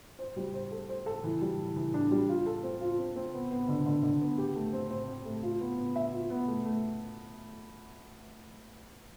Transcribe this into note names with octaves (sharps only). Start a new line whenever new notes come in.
C5
G3
C5
A4
C5
A4
E3
G3
E3
E3
D4
G3
F4
A4
C4
F4
C4
C4
B3
B3
D3
D3
D3
B3
G4
A3
C4
C4
C4
A3
F4
B3
B3
E5
F4
B3
A3
A3